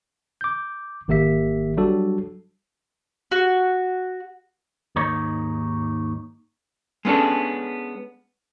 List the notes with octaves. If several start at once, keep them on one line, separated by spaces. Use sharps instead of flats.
D6 G6
G#1 D#3 A#3 G4 E5 B6
F#3 G3 D4 F#4 A4
F#4
D#2 G#2 D#4 C#5
G#3 B3 C#4 D4 A4